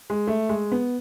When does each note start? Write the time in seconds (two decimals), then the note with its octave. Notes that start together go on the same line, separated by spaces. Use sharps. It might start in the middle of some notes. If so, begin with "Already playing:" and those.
0.10 G#3
0.28 A3
0.49 G#3
0.72 B3